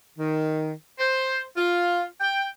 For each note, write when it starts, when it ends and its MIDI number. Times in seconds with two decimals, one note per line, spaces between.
0.19 0.72 51
0.99 1.43 72
1.57 2.05 65
2.21 2.47 79